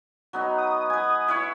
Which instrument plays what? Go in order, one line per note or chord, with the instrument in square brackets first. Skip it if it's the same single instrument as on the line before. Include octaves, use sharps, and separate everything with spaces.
[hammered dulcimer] F#3 B3 D#4
[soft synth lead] D#6
[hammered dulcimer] B4 G#5
E4 B4 C#5